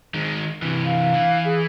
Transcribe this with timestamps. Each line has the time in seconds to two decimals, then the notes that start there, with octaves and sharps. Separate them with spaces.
0.14 D#3 G#3
0.62 C3 E3
0.86 F5
1.14 E3
1.45 G#4